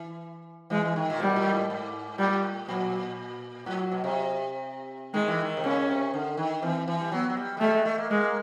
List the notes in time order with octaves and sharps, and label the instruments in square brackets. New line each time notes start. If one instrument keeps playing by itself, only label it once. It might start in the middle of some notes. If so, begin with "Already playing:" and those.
Already playing: [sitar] E3
[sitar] E3 [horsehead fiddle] G#3
[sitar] E3
D#3
A#2
[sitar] B2 [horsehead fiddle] G3
[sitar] A2
G#2
G#2
[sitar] A2 [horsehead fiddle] G3
[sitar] A#2 [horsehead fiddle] F#3
[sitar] A2 [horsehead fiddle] F#3
[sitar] B2
C3
[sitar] D#3 [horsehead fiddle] G#3
[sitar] E3
D#3
C3
[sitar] C#3 [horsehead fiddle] C#4
[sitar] C3
D3
D#3
[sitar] E3 [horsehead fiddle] C4
[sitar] E3
G3
[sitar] F#3 [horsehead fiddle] B3
[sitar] F#3
G3
G#3
[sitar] G3 [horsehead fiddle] A3
[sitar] G#3
A3
A#3
[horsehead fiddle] G#3 [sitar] A#3